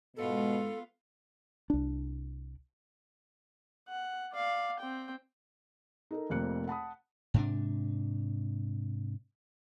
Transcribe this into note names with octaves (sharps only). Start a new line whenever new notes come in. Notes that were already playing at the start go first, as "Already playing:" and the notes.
D#2 G#2 B2 G#3 B3 F4 A4
C2 D4
F#5
D5 F5
C4 G5
D#4 A4 A#4
F1 F2 A#3 C4 F#6 C#7
F#5 A5 B5 D#6
G#2 C3 D4